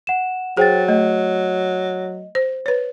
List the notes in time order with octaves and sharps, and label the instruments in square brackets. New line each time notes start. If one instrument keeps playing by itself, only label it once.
[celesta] F#5 E7
[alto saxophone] F#3 [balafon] G#4 [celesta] C5 G5 A6
[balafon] A3 [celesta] D#5
[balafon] C5
B4 C#5